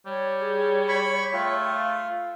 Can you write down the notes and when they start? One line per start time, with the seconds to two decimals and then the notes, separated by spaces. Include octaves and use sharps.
0.06 G3 C#5
0.41 G#4
0.88 B5 C#6
1.33 A3 F4 G5
1.70 F5